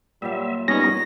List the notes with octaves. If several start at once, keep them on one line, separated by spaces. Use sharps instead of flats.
A#2 F#3 G3 E5
G3 B3 C#4 D#4 A#6